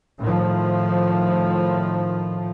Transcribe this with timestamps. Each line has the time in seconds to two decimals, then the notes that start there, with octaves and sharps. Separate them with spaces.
0.19 A2 D#3 F3